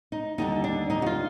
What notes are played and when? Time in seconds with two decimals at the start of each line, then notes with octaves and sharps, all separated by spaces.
0.12 D#4
0.38 D#2 D3 G3 D#4
0.64 D4
0.90 D#4
1.02 F#4
1.06 F4